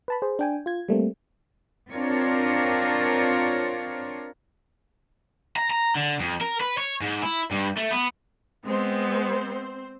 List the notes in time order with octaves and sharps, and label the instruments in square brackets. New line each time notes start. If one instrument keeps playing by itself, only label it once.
[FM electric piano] B4 A5 B5
G#4 C5
D4 G5 G#5
F4 G#6
G3 A3 A#3 C4
[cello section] C4 D4 F4 A#4 C#5
[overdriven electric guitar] A#5
A#5
D3
F2
A#4
B4
C#5
G#2
E4
G2
A3
B3
[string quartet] G#3 B3 [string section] C4 C5